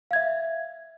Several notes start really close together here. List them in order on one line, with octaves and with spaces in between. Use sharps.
F5 G#6 E5